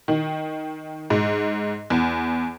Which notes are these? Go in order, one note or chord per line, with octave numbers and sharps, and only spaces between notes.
D#3
G#2
E2